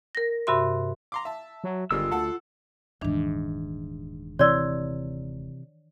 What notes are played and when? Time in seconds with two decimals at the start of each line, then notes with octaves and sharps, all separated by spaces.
0.15 A#4 A#6
0.47 G2 C3 F#4 E5 C6
1.12 A#5 C6 D6
1.25 E5 A5
1.64 F#3
1.91 G1 D#3 G3 G#3 F4 E6
2.11 D2 A4 F#5 A5
3.01 D#1 G#2 D#3 E3 D4
4.39 C3 E3 C#5 D5 C6 E6